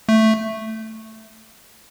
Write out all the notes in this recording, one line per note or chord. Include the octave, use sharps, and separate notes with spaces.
A3